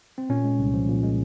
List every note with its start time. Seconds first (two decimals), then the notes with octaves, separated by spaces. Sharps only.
0.18 C4
0.29 A#2 C#4
0.44 G#3
0.59 C2
0.74 F3
0.88 A#2
1.03 G#3